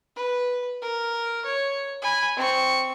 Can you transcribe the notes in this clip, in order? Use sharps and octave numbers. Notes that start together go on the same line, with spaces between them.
B4
A#4
C#5
G#5 B5
C4 C#6